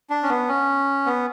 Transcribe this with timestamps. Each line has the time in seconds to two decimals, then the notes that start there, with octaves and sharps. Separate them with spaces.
0.10 D4
0.23 C#4
0.29 B3
0.49 C#4
1.06 B3